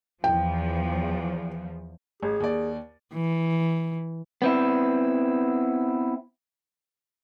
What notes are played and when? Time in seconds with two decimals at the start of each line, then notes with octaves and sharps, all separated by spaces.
0.24 E2 F3 G5
2.23 A1 G#4
2.40 D#2 D5
3.14 E3
4.42 B3 C4 E4